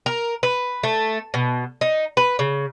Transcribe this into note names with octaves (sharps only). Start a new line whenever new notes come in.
A#4
B4
A3
B2
D#4
B4
C#3